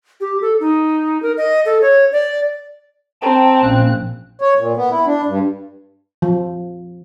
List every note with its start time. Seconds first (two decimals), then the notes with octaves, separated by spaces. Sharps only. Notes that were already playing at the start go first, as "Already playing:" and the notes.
0.21 G4
0.42 A4
0.60 D#4
1.23 A#4
1.37 D#5
1.66 A4
1.82 C#5
2.12 D5
3.22 C4 G5 A5 A#5
3.62 A#1 A#3 C#4 F#6
4.41 C#5
4.59 A#2
4.77 B3
4.90 E4
5.06 D4
5.26 G2
6.22 F3